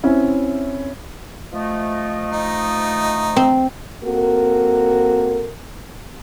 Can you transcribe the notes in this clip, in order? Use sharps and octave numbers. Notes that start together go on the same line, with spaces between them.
C4 C#4 E4
F3 A3 D#5
D#4
C4
A#3 C4 F#4 A4 A#4